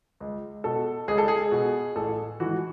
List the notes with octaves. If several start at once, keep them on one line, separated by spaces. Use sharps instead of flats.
C#2
B2 A4
C#2 G#4
A4
G#4
B2
A1 A4
G#2 E3 F#4